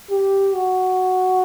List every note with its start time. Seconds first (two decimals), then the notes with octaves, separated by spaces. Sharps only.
0.10 G4
0.54 F#4